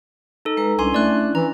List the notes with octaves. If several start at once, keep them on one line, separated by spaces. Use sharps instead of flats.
D#4 A4
G#3 B4 A#5
C2 C#4 D4 E4 G#5 C6
A3 D5 F#6
E3 A#5